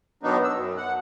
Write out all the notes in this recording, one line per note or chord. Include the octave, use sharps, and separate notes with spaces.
B2 D#3 F#3 B3 D4 D#4
E6
F#2
F#5